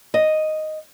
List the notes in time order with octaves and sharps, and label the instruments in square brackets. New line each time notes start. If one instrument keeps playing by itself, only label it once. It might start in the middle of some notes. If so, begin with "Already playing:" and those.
[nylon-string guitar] D#5